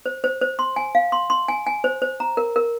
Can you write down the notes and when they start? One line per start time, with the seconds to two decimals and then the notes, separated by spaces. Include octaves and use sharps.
0.06 C5
0.24 C5
0.41 C5
0.59 C6
0.76 G#5
0.95 F5
1.12 C6
1.30 C6
1.48 G#5
1.67 G#5
1.84 C5
2.02 C5
2.20 A#5
2.37 A#4
2.56 A#4